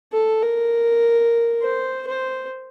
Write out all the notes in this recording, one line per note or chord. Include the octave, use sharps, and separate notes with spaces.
A4
A#4
C5
C5